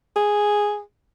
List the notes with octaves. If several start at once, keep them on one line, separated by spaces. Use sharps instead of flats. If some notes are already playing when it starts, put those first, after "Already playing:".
G#4